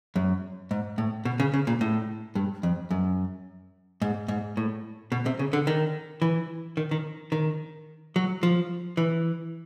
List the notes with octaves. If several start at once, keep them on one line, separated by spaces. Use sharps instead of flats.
F#2
G#2
A2
B2
C#3
C#3
A#2
A2
G2
F2
F#2
G#2
G#2
A2
B2
C3
C#3
D3
D#3
E3
D#3
D#3
D#3
F#3
F3
E3